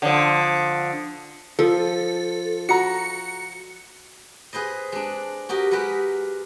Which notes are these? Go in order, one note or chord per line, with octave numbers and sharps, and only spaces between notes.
D3 F3
F3 A4
F#4 A#5 C#7
G#4 B4 C5 D#5
G#3 D4
F#4 G4 A#4 D#5
G#3 G4 A#4 B4 F#5